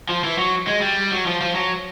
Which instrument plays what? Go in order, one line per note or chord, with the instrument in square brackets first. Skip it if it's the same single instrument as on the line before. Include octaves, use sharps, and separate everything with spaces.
[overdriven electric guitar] F3
E3
F#3
G#3
G3
F#3
F3
F3
F#3